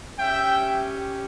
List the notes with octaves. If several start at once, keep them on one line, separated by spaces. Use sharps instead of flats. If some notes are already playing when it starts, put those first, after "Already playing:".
C#4 G4 E5 G5